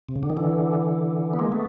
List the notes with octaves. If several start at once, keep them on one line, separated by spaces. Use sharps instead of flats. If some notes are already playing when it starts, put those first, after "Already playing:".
C3
C#3
D3
D#3
D3 E3
B3
G#3 A#3
A3 B3